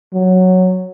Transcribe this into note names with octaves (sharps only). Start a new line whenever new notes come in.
F#3